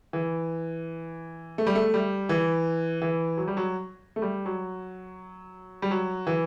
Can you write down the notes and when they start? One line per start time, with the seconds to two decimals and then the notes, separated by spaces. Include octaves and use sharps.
0.13 E3
1.58 A3
1.67 G3
1.75 A3
1.94 G3
2.29 E3
3.02 E3
3.37 F#3
3.48 G3
3.57 F#3
4.16 A3
4.22 G3
4.46 F#3
5.82 G3
5.91 F#3
6.27 E3